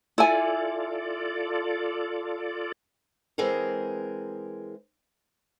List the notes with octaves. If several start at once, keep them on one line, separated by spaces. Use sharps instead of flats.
E4 F4 A4 D5 G#5
E3 G#3 C4 G#4 A#4